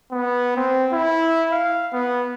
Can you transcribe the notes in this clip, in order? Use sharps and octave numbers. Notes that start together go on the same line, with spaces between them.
B3
C4
E4
F5
B3